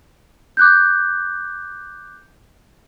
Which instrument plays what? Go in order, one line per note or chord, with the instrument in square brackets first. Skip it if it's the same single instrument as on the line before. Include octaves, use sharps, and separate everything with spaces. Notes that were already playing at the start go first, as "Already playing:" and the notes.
[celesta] D6 F#6 G6